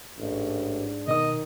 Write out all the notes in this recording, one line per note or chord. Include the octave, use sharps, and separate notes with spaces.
A1 G#2 D4
B2 D#3 D#5 D#6